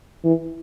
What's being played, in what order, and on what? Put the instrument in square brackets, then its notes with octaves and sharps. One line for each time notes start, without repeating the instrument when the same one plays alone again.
[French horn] E3